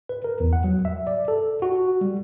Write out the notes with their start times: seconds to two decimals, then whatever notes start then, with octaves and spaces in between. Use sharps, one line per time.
0.09 B4
0.24 A#4
0.40 E2
0.53 F#5
0.64 F#3
0.85 E5
1.07 D5
1.28 A4
1.62 F#4
2.01 G3